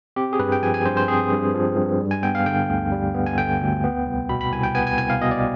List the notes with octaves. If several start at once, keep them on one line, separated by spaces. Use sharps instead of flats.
C4 G4
G#4
G2 B4
G5
F3 G#5
G#5
G2 C5
C5
C4 G#4
G2
F3
G2
G3
G#5
B3 G5
F5
D3 G5
D2
G3
B3
G#5
D3 G5
D2
B3
C2
B2 B5
B5
C2 G#5
G5
B3 G#5
G#5
C2 G#5
F5
B2 D#5
D5